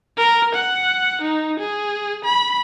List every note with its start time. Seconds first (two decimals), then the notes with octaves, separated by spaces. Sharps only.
0.18 A#4
0.55 F#5
1.21 D#4
1.59 G#4
2.24 B5